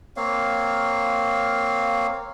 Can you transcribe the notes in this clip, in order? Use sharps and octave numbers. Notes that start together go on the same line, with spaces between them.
A#3 C4 C#5 F5